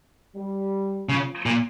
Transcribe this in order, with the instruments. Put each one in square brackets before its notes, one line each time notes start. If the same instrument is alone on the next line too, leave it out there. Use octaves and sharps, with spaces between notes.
[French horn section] G3
[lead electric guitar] C#3 [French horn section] F3
[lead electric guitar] A#2